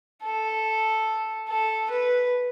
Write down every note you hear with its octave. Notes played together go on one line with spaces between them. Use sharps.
A4
A4
B4